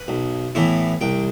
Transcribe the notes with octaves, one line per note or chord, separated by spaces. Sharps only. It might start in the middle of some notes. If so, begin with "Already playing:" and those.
Already playing: B4
B1
A2 E3 B3 E4
C2 G5